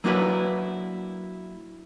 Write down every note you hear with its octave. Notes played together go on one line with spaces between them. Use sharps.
F#3 A#3 D4 E4 F#4 B4